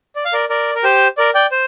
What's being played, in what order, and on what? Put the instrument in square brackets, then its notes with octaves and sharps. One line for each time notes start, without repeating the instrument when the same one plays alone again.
[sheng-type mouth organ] D5
F5
A#4 D5
A#4 D5
A#4
G4 C5
A#4 D5
D5 G5
C5